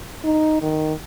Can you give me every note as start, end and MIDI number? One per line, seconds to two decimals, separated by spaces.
0.24 0.57 63
0.62 0.93 51